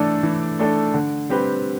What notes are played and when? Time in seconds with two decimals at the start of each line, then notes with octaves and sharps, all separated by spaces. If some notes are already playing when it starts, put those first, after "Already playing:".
Already playing: E3 A3 D4 A4 D5
0.23 E3
0.59 A3 D4 A4 D5
0.94 D3
1.30 G3 C4 G4 B4